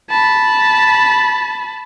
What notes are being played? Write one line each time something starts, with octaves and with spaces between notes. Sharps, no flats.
A5 B5